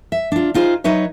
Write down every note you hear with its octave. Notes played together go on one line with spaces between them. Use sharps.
E5
D4 F4
D#4 F4 G#4 C5
F#3 D#4 B4 C#5 E5